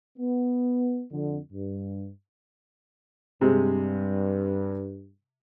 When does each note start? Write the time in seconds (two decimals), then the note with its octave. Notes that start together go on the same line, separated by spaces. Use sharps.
0.18 B3
1.12 F2 D3
1.52 G2
3.41 G2 C3 G#3